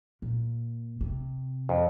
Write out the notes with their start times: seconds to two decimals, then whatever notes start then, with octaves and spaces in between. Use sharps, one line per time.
0.22 A#2
1.01 C3
1.69 F2